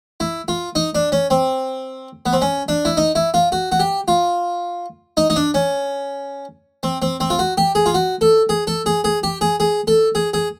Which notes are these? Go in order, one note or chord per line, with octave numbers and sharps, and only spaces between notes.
E4
F4
D#4
D4
C#4
C4
B3
C4
C#4
D4
E4
D#4
E4
F4
F#4
F#4
G4
F4
D#4
D#4
D4
C#4
C4
C4
C4
F4
F#4
G4
G#4
F4
F#4
A4
G#4
A4
G#4
G#4
G4
G#4
G#4
A4
G#4
G#4